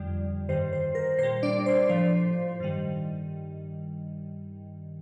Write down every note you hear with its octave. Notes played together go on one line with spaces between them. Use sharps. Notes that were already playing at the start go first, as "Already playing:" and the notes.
Already playing: F2 D3 G3
G2 D#3 G3 C5
C5
A#4
A#2 G3 C5
D4 D5
C5
A2 F3 C5
G2 D#3 G3